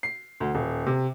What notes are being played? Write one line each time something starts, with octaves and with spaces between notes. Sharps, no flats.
C7
D2
D#1
C3